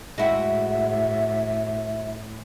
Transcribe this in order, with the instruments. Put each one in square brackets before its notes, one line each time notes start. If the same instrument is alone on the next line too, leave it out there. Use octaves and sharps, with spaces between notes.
[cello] A2 [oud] G#3 E4 [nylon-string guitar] F#4 F#5 G5 [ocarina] E5